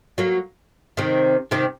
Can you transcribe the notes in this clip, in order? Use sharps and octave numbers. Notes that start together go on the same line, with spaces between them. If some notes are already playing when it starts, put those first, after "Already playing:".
F#3 A#3
C3 D#3
C3 D#3